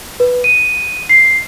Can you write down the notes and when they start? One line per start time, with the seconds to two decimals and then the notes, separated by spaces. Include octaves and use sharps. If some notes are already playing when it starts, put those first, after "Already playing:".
0.20 B4
0.44 D#7
1.09 C7